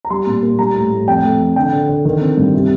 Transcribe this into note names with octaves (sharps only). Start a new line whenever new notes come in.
A#5
G3 C6
A#2
A#3
G3 A#5
A2
A2
F2 G5
A3
F2
D3 G5
D3
D3
D#3
C4
G2
C3